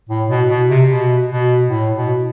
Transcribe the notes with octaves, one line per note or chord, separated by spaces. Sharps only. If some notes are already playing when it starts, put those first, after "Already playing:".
A2
B2
B2
C3
B2
B2
A2
B2